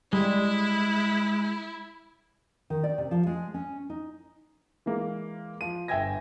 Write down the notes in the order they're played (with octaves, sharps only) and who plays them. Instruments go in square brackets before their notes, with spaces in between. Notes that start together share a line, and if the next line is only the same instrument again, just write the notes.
[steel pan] G3 [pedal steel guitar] G#3 [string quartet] E4
[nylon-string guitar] D#3
D5
C3
F3
G#3
C#4
D#4
[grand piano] E3 G#3 A#3
F3 D#7
G1 E5 G5 G#5 G#6 A#6